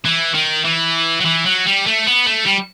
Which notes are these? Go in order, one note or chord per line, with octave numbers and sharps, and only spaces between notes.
E3
D#3
E3
F#3
E3
F#3
G3
A3
B3
A3
G3